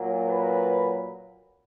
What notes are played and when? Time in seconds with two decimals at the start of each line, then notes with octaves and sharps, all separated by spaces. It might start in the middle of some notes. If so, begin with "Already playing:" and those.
Already playing: A#2 F#3
0.28 B4